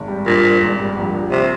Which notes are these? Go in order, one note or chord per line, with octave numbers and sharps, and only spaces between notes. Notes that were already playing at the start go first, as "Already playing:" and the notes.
Already playing: G#1
G3
G2 A#2
G3
G#1
G3
A#1
A#1
C3